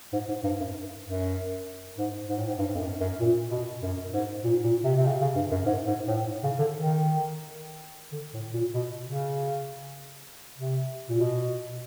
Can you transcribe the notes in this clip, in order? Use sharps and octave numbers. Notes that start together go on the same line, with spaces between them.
G#2
G#2
G2
F#2
F#2
G#2
G#2
A2
G#2
G2
F2
F#2
F#2
A#2
B2
F#2
G#2
A#2
A#2
C3
C3
C#3
C#3
G2
F#2
G#2
G#2
A2
C#3
D3
D#3
D3
A2
A#2
B2
C#3
C3
A#2
B2